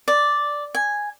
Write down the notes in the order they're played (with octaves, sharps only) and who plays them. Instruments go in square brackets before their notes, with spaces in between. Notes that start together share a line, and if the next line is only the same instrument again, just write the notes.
[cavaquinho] D5
G#5